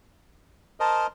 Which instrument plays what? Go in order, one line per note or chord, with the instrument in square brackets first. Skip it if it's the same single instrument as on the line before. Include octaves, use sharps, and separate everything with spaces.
[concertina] A#4 C5 D#5 [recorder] A5